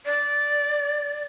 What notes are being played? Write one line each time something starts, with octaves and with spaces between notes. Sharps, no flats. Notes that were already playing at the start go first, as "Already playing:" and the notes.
D5